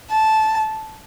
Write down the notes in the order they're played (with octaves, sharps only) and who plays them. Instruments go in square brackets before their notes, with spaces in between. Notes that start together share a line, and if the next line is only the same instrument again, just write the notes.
[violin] A5